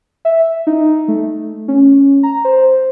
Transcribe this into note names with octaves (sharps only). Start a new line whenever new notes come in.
E5
D#4
A3
C#4
A#5
C5